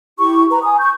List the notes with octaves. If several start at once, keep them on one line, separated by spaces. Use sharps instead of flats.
E4 G4 C#6
B4 A#5
G#5 D#6
C#6 G6